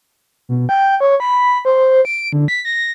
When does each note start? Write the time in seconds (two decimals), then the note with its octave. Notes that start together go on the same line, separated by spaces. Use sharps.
0.49 B2
0.69 G5
1.00 C#5
1.20 B5
1.65 C5
2.05 D7
2.33 D3
2.48 B6
2.65 A#6